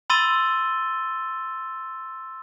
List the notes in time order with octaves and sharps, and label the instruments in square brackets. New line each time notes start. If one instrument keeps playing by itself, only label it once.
[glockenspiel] B5 C6 E6 A6 D#7 G7